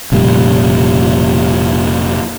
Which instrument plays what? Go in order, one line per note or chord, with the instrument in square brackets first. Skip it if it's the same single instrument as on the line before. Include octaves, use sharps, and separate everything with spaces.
[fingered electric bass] F1 A#2 C#3 G3